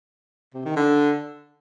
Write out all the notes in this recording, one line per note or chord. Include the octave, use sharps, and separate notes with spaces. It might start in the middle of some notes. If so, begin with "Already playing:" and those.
C3
D#3
D3